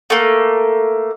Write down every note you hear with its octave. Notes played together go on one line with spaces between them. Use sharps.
A3 A#3